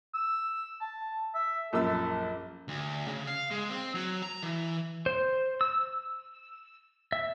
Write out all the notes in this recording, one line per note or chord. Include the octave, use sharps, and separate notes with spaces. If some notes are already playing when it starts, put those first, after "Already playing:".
E6
A5
E5
A#1 F#2 A4 E6
D2
C#3
F5
G#3
C4
F#3
A#5
E3
C5
E6
E5